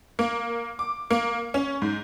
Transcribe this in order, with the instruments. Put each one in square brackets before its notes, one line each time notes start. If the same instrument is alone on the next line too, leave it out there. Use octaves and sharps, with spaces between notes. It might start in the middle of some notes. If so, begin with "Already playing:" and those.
[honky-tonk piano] A#3
D6
A#3
C#4
G#2